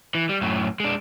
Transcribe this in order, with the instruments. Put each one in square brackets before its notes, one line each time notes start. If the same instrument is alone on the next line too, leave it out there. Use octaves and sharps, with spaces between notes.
[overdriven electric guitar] E3
G3
F#2 A2
G#3 D4